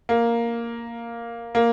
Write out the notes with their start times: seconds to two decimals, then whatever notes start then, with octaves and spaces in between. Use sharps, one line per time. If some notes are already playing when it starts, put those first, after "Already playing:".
0.09 A#3
1.55 A#3